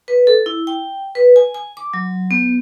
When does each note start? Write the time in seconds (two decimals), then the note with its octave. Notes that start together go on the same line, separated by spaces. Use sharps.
0.08 B4
0.27 A4
0.46 E4
0.67 G5
1.15 B4
1.36 G#5
1.54 G#5
1.77 D6
1.94 F#3
2.31 B3